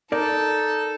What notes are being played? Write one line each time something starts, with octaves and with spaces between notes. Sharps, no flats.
D#4 A4 A#4 D5